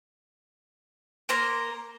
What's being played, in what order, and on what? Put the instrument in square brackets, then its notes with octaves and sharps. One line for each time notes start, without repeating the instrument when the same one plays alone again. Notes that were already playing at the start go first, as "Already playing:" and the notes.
[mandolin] A#3 A#4 A#5 C6